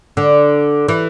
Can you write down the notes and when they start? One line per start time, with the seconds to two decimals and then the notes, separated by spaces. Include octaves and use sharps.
0.17 D3
0.88 E3